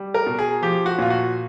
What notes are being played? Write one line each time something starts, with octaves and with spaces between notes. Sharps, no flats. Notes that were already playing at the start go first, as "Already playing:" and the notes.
Already playing: G3
A#4
B2
G#4
F3 G4
F#4
A#2 F4
F#4